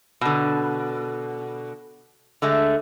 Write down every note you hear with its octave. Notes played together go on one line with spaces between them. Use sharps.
B2 D3
D3 G#3 A3